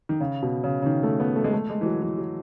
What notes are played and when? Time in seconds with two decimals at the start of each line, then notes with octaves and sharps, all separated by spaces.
0.09 D#3
0.21 C#3
0.43 B2
0.64 C#3
0.82 C#3
0.86 D#3
1.03 A3
1.20 B3
1.36 A3
1.44 G#3
1.53 A3
1.70 G#3
1.81 E3
1.85 F#3
2.02 E3
2.18 F#3